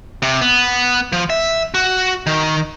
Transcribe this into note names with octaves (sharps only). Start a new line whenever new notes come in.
C3
B3
F3
E5
F#4
D#3